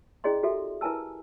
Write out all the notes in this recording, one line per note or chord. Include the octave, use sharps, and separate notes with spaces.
C#4 E4 G#4 D5 D#5 C6
F#4 G4 A4 E5
E4 A#4 B4 G#5 A5 E6